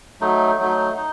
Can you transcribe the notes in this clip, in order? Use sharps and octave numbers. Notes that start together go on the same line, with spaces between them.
F#3 A3 D#4
F#3 A3 D#4
D#4